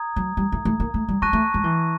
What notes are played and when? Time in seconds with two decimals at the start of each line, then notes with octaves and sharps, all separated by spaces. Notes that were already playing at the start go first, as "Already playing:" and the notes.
Already playing: A#5 D#6 G#6
0.16 F#3
0.37 G3
0.52 A3
0.65 A3
0.80 A#3
0.94 A3
1.09 G3
1.22 G#3 A5 C#6 F#6 A#6 D#7
1.33 A3
1.54 G#3
1.64 E3